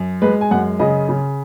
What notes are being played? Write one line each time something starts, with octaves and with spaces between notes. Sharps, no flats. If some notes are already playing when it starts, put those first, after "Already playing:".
Already playing: F#2
G#3 B4
G#5
F#2 F#5
C#3 D#5
C#3